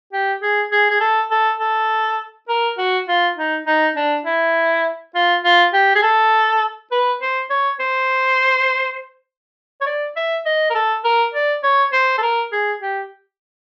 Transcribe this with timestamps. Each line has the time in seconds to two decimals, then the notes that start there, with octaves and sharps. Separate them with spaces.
0.13 G4
0.42 G#4
0.72 G#4
0.90 G#4
1.01 A4
1.31 A4
1.60 A4
2.49 A#4
2.78 F#4
3.08 F4
3.37 D#4
3.67 D#4
3.96 D4
4.25 E4
5.15 F4
5.44 F4
5.73 G4
5.95 G#4
6.02 A4
6.91 B4
7.21 C5
7.50 C#5
7.80 C5
9.81 C#5
9.86 D5
10.16 E5
10.46 D#5
10.70 A#4
10.75 A4
11.04 A#4
11.34 D5
11.63 C#5
11.93 C5
12.18 A4
12.22 A#4
12.52 G#4
12.82 G4